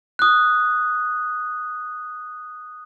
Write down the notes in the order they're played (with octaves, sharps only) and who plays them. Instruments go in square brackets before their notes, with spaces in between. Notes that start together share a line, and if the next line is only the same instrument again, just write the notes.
[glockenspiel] D#6 F#6